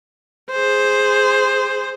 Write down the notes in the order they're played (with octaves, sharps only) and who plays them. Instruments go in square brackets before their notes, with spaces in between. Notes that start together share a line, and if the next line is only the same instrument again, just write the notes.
[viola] G#4 C5